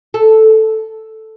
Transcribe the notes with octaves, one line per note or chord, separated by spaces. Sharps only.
A4